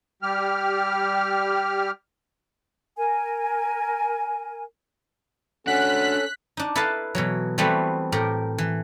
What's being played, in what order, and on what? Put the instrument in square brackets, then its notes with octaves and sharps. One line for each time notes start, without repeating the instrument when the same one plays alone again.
[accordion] G3 G4 F6
[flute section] A#4 G#5
[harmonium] C#4 A4 [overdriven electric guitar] D4 F#4 [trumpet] F#5 [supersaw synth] F#6 B6
[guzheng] D4 D#4
E4 A4 B4 D#5 F5 A5
B2 E3 F#3
E3 G3 A3 B3 C4 F#4
A2 G4 A#4
E3